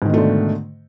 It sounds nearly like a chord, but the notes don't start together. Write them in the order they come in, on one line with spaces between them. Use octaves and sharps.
G#2 D#3 B2 A3 D3